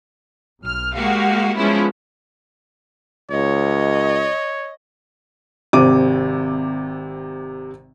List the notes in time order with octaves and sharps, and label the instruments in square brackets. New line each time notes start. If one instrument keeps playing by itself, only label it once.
[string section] B1 F6
G#3 A#3 F#4 G4 F5
F3 G#3 B3 C#4 E4
[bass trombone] C#2 [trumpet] C#5 [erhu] D#5
[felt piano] G#1 C3 D6 D#7